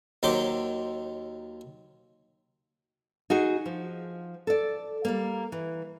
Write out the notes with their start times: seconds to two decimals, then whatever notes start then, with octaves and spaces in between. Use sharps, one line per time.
0.23 D#2 D#3 F#3 C5 C6 D6
3.30 D#4 F#4 G#4
3.66 F3
4.47 A4 D5
5.05 G3 A#3
5.52 E3